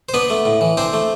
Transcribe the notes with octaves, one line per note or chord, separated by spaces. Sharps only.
C5
B3 D4 B4
A3
A2
E3
C4 D4 C5
A3